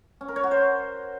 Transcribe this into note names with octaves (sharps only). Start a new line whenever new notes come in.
C#4
A#4
C#5
F#4
C5